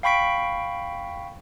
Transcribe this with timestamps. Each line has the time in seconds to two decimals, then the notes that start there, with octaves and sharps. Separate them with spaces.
0.03 F5 G5 B5 C#6 B6 D7